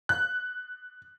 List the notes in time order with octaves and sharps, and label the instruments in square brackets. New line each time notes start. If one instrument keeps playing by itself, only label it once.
[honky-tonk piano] F#6